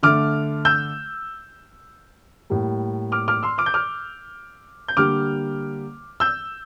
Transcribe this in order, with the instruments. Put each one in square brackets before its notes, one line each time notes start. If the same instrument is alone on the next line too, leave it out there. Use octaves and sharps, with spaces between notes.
[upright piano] D3 A3 D6 F6
E6 G6
A2 G3 A#3
D6 F6
D6 F6
C6 E6
D6 F6
G6
D6 F6
G6
D3 G3 A#3 D6 F6
E6 G6